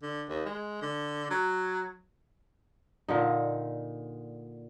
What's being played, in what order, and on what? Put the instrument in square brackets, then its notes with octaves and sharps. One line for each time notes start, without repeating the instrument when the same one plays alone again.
[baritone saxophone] D3
D#2
G#3
D3
F#3
[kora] A#2 D3 D#4